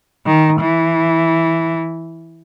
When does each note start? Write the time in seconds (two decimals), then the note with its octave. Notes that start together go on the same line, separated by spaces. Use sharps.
0.26 D#3
0.59 E3